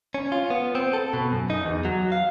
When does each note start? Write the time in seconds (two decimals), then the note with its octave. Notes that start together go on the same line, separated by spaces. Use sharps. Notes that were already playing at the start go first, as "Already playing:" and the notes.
0.14 C#4
0.32 F4
0.50 B3
0.75 C4
0.93 A4
1.13 B2
1.32 F#2
1.50 D#4
1.65 E2
1.85 F#3
2.12 F5